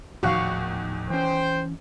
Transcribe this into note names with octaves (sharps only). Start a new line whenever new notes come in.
D#1 E2 A2 D#3 F3 F#4 F5 F#5
E3 C#4 C5 G5